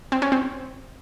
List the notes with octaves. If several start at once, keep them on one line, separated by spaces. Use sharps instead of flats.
C4
C#4
C4